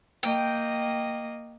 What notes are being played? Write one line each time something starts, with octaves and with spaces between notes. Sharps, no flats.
A#3 D#5 G5